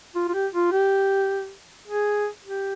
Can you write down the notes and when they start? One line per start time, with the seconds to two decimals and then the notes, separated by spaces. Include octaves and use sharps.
0.16 F4
0.28 F4
0.34 G4
0.54 F4
0.72 G4
1.87 G#4
2.45 G4